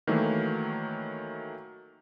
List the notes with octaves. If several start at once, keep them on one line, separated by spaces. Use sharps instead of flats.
D#3 E3 F#3 A3 A#3